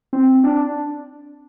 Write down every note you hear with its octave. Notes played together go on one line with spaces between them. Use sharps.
C4
D4